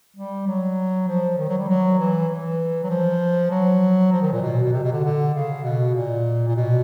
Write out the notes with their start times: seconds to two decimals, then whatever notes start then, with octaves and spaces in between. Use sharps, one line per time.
0.16 G3
0.47 F#3
1.08 F3
1.38 D#3
1.49 F#3
1.58 G3
1.69 F#3
1.99 E3
2.29 E3
2.83 F#3
2.90 F3
3.51 F#3
4.12 F3
4.22 D#3
4.32 A#2
4.42 B2
4.63 B2
4.73 C3
4.83 B2
4.93 D3
5.03 D3
5.34 C#3
5.64 B2
5.94 A#2
6.48 A#2
6.55 B2